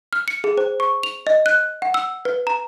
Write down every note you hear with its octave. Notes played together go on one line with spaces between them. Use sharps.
F6
C#7
G#4
C5
C#6
F7
D#5
F#6
F#5
E6
B4
A#5